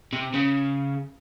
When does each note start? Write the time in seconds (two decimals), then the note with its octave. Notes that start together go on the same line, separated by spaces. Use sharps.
0.13 C3
0.34 C#3